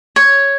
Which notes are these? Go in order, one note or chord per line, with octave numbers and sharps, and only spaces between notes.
C#5